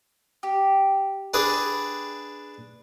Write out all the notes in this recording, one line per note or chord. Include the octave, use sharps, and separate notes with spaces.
G4
D4 G#4 B4